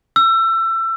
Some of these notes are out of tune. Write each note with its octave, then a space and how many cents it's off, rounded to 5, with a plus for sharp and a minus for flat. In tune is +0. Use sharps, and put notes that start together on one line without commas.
E6 +25